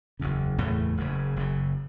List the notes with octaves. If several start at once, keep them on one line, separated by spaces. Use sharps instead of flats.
F#1 E2 C#3
F#1 E2 A2 C#3 A3
F#1 F#2 C#3
F#1 F#2 C#3